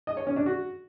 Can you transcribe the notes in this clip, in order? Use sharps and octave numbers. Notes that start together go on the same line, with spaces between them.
D#5
C#5
C#4
D4
F#4